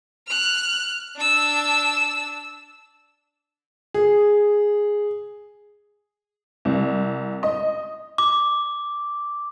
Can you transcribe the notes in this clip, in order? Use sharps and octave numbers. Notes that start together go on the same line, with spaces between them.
F6 F#6
D4 E6
G#4
C2
D#5
D6